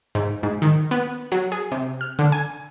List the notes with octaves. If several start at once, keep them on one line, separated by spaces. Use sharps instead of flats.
G#2
G#2
D#3
B3
F#3
G#4
C3
F6
D3
G#5